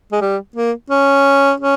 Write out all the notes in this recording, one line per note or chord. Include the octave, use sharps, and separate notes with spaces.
G#3
G3
A#3
C#4
C#4